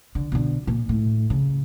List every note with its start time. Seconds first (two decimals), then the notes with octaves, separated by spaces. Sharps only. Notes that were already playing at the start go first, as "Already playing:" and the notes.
0.15 D3
0.32 B2 D3
0.67 A#2
0.89 A2
1.30 C#3